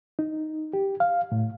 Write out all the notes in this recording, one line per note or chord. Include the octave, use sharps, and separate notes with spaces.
D#4
G4
F5
A2